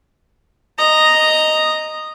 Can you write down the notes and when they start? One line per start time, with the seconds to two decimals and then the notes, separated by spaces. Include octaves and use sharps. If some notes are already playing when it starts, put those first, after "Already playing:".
0.78 D#5 A#5